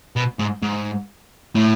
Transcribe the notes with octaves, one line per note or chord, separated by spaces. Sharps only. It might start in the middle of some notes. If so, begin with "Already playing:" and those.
B2
G#2
G#2
A2